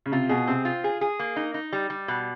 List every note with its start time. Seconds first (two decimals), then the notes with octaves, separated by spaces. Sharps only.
0.06 C#3
0.12 C3 F4
0.29 B2 G#4
0.47 C3 C4
0.65 F4
0.84 G#4
1.01 G#4
1.19 A#3
1.36 D#4
1.54 D#4
1.73 G3
1.90 G3
2.08 B2